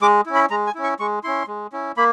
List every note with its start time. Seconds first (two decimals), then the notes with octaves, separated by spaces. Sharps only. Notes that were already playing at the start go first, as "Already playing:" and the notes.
0.02 G#3 D6
0.26 C#4 E4
0.35 B5
0.50 G#3 A#5
0.67 G#5
0.75 C#4 E4
0.84 C#6
0.99 G#3 C#6
1.24 C#4 E4 C6
1.48 G#3
1.72 C#4 E4
1.97 A#3 B5